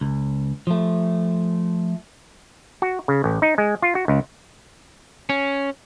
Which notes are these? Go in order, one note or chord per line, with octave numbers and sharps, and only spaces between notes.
C#2
F3 A3
F#4
C#3
A1
D#4
G#3
F4
F#4
C#2
C#4